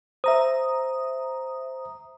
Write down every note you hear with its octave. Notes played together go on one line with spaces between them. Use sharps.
C5 E5 A#5 D#6